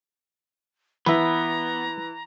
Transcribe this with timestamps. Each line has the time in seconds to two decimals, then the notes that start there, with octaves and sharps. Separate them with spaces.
1.06 E3 B3 B4 E5 A#5